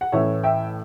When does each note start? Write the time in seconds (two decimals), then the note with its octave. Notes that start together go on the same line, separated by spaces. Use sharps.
0.01 F#5
0.12 A1 A2 E3 C#5 E5
0.44 E5 G5